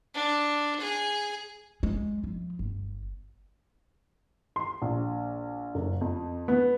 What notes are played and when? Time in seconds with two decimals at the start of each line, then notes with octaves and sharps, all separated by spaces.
0.14 D4
0.80 G#4
1.83 G#3
2.24 F3
2.59 G1
4.56 C6
4.82 A#1
5.75 F#1
6.01 F2
6.48 B3